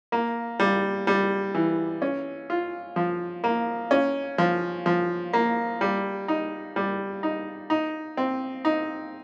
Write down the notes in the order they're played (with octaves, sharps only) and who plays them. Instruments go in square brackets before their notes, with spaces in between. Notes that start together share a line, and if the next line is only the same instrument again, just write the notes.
[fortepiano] A#3
G3
G3
E3
C#4
F4
F3
A#3
C#4
F3
F3
A#3
G3
D#4
G3
D#4
D#4
C4
D#4